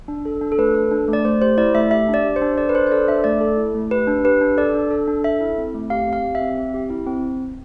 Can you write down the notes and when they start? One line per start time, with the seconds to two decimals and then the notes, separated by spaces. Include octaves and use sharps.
0.08 D4
0.25 A4
0.41 D4
0.52 A4
0.58 A3 B4
0.74 A4
0.91 D4
1.08 A3
1.13 D5
1.25 A3 C5
1.42 G4 C5
1.57 E4 D5
1.74 A3 E5
1.91 G4 E5
2.08 D4
2.14 D5
2.25 G4
2.36 C5
2.42 D4
2.58 A4 D5
2.69 B4
2.74 D4 C5
2.87 C5
2.91 A4 D5
3.08 D4 E5
3.24 A3 D5
3.41 A4
3.57 E4
3.75 A3
3.91 G4 B4
4.07 D4
4.24 G4 B4
4.41 D4
4.57 A4 D5
4.74 D4
4.91 A4
5.07 D4
5.24 A4 E5
5.41 E4
5.58 C4
5.74 A3
5.90 G4 F5
6.07 C4
6.13 F5
6.24 G4
6.35 E5
6.41 C4
6.57 C4
6.74 G4
6.90 E4
7.07 C4